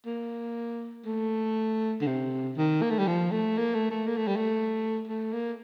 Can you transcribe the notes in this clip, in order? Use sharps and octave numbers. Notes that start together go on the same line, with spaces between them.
A#3
A3
D3
C3
D#3
A#3
A3
G3
F3
A3
A#3
A3
A3
A#3
A3
G3
A3
A3
A#3